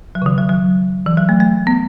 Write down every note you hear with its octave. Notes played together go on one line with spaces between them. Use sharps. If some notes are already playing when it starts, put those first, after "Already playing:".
F#3
C#3
D#3
F#3
F#3
E3
F#3
A3
A3
B3